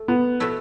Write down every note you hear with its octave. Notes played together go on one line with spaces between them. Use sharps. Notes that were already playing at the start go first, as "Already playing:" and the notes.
Already playing: A3
B3
B2 A3 E4